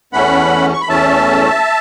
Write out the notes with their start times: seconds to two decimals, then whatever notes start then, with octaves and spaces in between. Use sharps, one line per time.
0.13 E2 E3 A3 C#4 F#5 B5
0.73 C#6
0.81 B5
0.89 E2 E3 A3 C#4 E5 A5